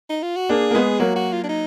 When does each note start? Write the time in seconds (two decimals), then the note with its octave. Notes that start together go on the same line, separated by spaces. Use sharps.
0.10 D#4
0.23 F4
0.36 F#4
0.49 A#3 D4 G#4
0.71 A#3
0.75 G#3 B3
1.00 F#3 A#3 F#4
1.16 F#4
1.33 F4
1.44 D4
1.49 D#4